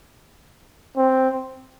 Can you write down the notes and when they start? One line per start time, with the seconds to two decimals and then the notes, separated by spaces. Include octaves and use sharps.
0.97 C4